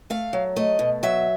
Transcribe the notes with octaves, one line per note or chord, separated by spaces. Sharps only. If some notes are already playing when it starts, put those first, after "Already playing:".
A3 F5
F#3
A3 D#5
B2
F#3 E5